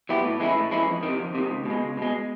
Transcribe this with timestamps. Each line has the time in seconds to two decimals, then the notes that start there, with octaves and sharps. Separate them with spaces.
0.09 F#3 B3 E4 G4
0.24 A2
0.40 E3 G#3 C#4 E4
0.57 A2
0.71 E3 G#3 C#4 E4
0.88 F2
1.03 C3 D#3
1.19 F2
1.35 C3 D#3
1.50 C#2
1.65 B2 G#3
1.82 C#2
1.97 B2 G#3